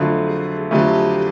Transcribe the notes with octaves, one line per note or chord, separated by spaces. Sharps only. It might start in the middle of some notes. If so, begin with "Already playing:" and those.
Already playing: F2 D3 F#3 A3
G#4
F2 D3 F#3 A3 G4